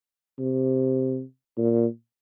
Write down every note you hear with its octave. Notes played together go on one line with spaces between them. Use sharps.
C3
A#2